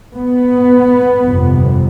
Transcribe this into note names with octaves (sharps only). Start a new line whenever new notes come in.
B3
G1 F2 C3